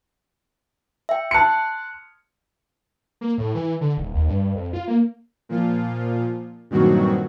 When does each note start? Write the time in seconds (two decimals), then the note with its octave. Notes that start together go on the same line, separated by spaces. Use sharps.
1.09 E5 G5
1.31 A5 C6 F#6 C#7
3.21 A#3
3.38 A2
3.55 E3
3.81 D3
3.97 D#1
4.14 D#2
4.29 G2
4.55 F2
4.73 F4
4.88 A#3
5.49 A#2 F3 F4
6.70 G2 A#2 D#3 F#3 C4 F#4